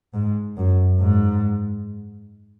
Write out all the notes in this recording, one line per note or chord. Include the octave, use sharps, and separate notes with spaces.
G#2
F#2
G#2